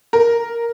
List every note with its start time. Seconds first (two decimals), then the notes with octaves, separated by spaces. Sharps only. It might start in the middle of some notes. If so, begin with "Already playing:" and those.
0.13 A#4